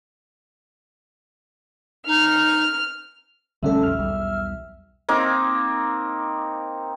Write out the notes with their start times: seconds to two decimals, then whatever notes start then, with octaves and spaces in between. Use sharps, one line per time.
2.07 D#4 F6
3.63 B1 D3 G3 A3 C#4 A4 E5
3.83 B1 F2 F6
3.99 B1 E2 G3
5.09 A#3 C4 D#4 D6